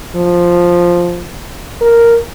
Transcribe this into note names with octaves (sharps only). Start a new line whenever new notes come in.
F3
A#4